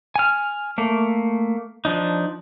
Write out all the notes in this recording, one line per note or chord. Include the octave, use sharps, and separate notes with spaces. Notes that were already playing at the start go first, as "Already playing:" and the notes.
G#5 F6
A3 A#3
F3 D4 D#4